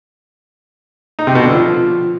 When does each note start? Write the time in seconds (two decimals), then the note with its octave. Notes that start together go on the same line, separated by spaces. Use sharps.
1.19 D#4
1.27 C3
1.35 B2
1.43 D3
1.52 F3